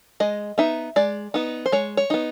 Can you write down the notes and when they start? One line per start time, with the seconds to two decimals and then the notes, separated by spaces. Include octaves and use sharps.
0.20 G#3 D#5
0.58 B3 D#4 E5
0.96 G#3 D5
1.34 B3 D#4
1.66 C5
1.72 G#3 C#5
1.97 C#5
2.10 B3 D#4